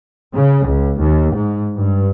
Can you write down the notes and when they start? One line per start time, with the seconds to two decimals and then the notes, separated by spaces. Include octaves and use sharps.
0.34 C#3
0.65 C#2
1.00 D#2
1.33 G#2
1.75 G2